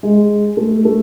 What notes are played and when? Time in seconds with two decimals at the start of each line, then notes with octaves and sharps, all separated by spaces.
0.03 G#3
0.57 A3
0.85 A3